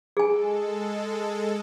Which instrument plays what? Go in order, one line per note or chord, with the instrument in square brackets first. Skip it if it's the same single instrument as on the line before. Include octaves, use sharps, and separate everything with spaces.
[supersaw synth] G#3 A4 [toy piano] G#4 G#5